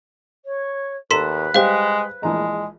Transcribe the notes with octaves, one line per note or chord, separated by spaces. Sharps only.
C#5
D#2 A4 B4 A#5 C6 B6 E7
G3 G#3 G4 C5 F5
A#1 E3 G#3 A#5